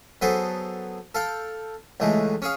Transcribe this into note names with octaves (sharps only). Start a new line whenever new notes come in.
F#3 B3 G#4 A4 C5
A4 F5 G5
C#2 E3 G#3 A3
C#4 G#4 F5